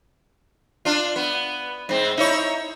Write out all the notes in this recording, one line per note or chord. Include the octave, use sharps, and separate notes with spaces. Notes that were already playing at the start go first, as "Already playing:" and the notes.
D4 F4
B3
G#2 C4
D#4 E4 C#5